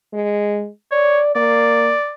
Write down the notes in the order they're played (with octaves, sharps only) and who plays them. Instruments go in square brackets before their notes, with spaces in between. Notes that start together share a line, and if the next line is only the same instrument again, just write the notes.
[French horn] G#3
[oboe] C#5 [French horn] D5
[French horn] A#3 [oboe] D5